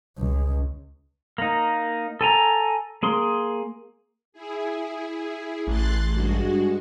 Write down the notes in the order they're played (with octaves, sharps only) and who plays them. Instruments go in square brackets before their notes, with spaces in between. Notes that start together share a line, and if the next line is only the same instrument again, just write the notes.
[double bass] C#2
[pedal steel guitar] A#3 D#4
A4 G#5 A#5
A#3 G#4 C6
[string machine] E4 G#4
[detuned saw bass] A1 [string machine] C6 F#6 A6
[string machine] G2 G#3 F#4